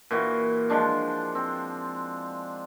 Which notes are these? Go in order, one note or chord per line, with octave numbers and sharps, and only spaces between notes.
A#2 E3 F#4
F3 G#3 D4
C4